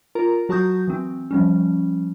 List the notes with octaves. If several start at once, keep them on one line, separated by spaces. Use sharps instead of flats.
F4 A#4 A#5
F#3 F#4 A5 C#6 D#6 G6
E3 C4
F3 G3 C#4